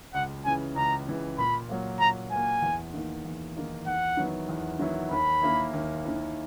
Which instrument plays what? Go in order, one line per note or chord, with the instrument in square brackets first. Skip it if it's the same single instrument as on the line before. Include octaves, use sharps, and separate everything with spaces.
[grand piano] C#2 [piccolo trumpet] F#5
[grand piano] C#3 E3 [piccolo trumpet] G#5
[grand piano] C#2 [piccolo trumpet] A#5
[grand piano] C#3 E3
[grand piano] A#2 [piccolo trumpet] B5
[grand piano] F#3 A#3
[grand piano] A#2 [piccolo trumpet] A#5
[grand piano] F#3 A#3 [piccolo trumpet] G#5
[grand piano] E2
D#3 A#3 D#4
E2
D#3 A#3 D#4
[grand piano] E2 [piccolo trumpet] F#5
[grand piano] D#3 F#3 B3 E4
E2
D#3 F#3 B3 E4
[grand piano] D#2 [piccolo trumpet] B5
[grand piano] D#3 A#3 E4
D#2
D#3 A#3 E4